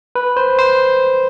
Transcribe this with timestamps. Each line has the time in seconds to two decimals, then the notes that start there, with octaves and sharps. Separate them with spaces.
0.15 B4
0.37 C5
0.59 C5